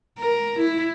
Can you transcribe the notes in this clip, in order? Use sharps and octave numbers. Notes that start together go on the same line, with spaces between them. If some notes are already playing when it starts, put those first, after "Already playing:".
A#4
E4